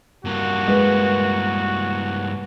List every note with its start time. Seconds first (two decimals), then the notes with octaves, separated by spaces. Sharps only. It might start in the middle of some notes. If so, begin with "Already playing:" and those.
0.25 G2 A#3 F#4
0.68 G#3 B4